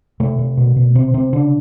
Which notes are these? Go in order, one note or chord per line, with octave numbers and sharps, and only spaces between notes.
C3 A3
C3
B2
B2
C3 C4
C3 C4
C#3 D4